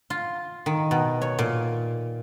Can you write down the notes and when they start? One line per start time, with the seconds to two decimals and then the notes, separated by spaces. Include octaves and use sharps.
0.10 F4
0.66 D#3
0.91 B2
1.22 C#5
1.39 A#2